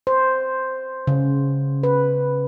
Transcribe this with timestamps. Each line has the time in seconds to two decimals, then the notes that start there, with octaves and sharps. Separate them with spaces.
0.07 C5
1.07 C#3
1.83 B4